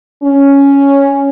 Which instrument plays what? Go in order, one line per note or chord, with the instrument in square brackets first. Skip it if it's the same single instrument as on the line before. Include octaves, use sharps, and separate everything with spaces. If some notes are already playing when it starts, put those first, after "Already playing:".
[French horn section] C#4